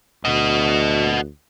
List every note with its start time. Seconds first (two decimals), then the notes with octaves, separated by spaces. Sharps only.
0.25 D2 F#4 D#5